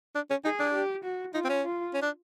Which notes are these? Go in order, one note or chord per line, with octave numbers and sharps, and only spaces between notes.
D4
C#4
D#4 G#4
D4
G4
F#4
D#4 F4
C4
C#4
F4
C#4
D4